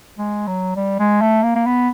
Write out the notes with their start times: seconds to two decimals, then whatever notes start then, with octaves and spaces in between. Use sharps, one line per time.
0.18 G#3
0.47 F#3
0.76 G3
0.99 G#3
1.21 A3
1.43 A#3
1.55 A#3
1.66 B3